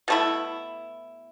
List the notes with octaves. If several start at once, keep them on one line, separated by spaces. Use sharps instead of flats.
B2 A3 E4